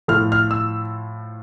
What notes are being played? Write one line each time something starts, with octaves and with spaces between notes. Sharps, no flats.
A2 F3 F6
F6
E6